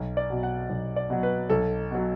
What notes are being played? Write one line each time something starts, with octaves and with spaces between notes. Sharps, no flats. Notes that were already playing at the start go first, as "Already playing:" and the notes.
Already playing: B1
D5
B2 F#3
F#5
B1
D5
B2 F#3
B4
B1 A4
B2 F#3